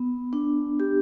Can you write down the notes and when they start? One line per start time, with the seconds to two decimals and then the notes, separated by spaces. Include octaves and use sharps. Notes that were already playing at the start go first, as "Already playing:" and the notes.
Already playing: B3
0.33 D4
0.80 G4